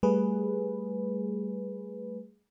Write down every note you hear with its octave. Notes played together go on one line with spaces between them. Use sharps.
G3 A3 G#4 B4